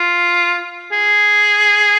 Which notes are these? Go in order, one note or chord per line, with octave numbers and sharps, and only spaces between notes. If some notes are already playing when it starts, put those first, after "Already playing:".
Already playing: F4
G#4